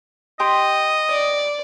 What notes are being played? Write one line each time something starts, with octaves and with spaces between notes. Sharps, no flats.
G4 D#5 G5 C6
D5